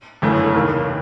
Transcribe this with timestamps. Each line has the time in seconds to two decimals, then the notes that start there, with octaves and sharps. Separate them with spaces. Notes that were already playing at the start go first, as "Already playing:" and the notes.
0.22 G1 F#2 C#3 E3 A3
0.45 A4
0.54 F1 D#2 D#3 A#4